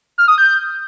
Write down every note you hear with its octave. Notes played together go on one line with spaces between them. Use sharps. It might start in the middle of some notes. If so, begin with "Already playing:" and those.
F6
D#6
G6